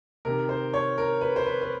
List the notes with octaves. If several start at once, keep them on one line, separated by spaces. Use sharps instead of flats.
C3 D#3 A#4
C5
C#5
A#4
B4
C5
B4
B4